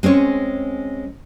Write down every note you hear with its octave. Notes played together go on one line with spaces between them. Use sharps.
G#3 C4 C#4 C#5